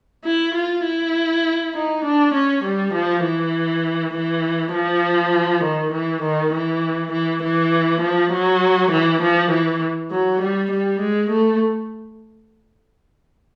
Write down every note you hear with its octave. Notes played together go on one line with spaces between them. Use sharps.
E4
F4
E4
D#4
D4
C#4
G3
F3
E3
E3
F3
D#3
E3
D#3
E3
E3
E3
F3
F#3
E3
F3
E3
F#3
G3
G3
G#3
A3